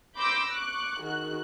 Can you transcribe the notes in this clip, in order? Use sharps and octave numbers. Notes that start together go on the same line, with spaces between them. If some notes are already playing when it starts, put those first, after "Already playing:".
B5 C6 D6 E6 G6 A#6
C#6 D6 F#6
D#3 F#4 G#4 F#6